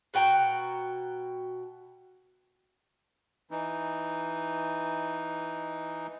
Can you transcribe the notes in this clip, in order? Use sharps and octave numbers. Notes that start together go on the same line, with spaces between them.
B2 F#4 G5 A#5
E3 D#4